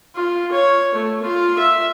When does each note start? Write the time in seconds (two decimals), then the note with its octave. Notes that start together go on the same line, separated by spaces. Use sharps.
0.15 F4
0.52 C#5
0.94 A3
1.23 F4
1.58 E5